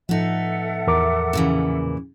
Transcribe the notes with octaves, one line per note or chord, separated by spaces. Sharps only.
A2 F3 B3 D#4 A4 E5 F#5
E2 A#4 D6
A#2 C#3 E3